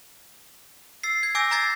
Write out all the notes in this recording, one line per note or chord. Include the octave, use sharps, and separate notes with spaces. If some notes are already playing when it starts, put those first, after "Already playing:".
E6 A6 C7
G#6
G#5 D6 E6 G6 A#6
A#5 D6 E6 G#6 A6 C7